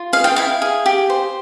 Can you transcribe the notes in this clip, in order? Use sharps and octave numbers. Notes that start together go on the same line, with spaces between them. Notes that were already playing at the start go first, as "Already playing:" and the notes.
Already playing: F4
G#4 F5
G5
E4 F5
G#4
G4
C5